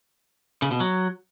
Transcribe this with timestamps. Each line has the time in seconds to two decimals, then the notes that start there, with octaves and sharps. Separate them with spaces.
0.62 C#3
0.71 B2
0.80 F#3